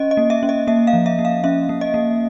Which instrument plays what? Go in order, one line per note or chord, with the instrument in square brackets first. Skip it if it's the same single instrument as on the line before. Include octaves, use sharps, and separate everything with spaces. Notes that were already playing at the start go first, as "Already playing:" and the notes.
Already playing: [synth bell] C#4 D#5
D#5
A#3
E5
C#4
D#5
A#3 E5
F5
F3
E5
A#3
F5
C#4 E5
A#3
D#5
A#3